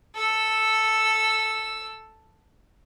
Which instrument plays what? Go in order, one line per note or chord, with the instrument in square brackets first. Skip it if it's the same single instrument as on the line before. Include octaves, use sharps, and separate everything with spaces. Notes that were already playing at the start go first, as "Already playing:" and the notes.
[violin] A4 E6